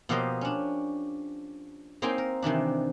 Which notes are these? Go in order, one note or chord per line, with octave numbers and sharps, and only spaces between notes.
B2 F3 A#3 G4 C5 D#5
C#4 D4
A#3 C4 D#4 C5 G5 G#5
A#4
C3 D#3 E3 D4